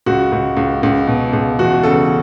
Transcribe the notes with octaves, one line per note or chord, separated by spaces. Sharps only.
C#2 F#4
C#2
C#2
C#2
B2
C#2
E2 F#4
C#3 A4